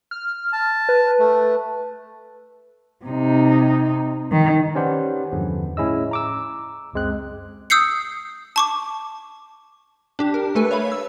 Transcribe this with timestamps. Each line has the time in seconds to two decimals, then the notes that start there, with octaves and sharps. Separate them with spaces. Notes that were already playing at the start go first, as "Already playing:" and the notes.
0.11 F6
0.53 A5
0.89 B4
1.19 A3
3.05 C3 D#4
4.32 D#3
4.75 C#4 G4 B4 C5 D5 F#5
5.32 E2 G2 D3 F3 B3
5.77 A2 C#4 E4 G#4 D#5 E6
6.11 A#5 D6 E6
6.93 C#2 F#2 G#3 C4 F#6
7.70 D#6 E6 G6 C7 C#7
8.56 A5 C#6 D6
10.19 D4 G4
10.34 A#4
10.55 A3 A4 B4 G#5
10.71 C#5 E5 F5 B5
10.92 E6